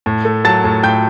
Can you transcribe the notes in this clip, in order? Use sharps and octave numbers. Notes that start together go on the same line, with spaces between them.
A2
A3
F#3 A5 A6
A2
A2 G5 G6